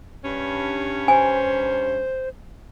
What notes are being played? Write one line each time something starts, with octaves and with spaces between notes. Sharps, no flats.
G2 C#4
C5 G#5